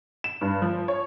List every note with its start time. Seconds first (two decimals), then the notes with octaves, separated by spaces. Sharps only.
0.24 E7
0.41 G2
0.62 F3
0.88 C#5